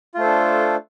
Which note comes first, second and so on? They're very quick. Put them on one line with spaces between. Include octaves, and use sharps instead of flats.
F4 A3 C5 A4 D4